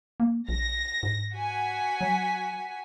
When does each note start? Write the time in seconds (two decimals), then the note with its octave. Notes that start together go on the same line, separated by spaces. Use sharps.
0.20 A#3
0.49 A#1 A#6
1.03 G#2
1.34 F#4 G#5 B6
2.01 F#3